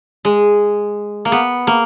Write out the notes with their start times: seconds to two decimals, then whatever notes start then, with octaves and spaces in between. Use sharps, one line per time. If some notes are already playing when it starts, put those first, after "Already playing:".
0.25 G#3
1.25 A#3
1.32 B3
1.67 A#3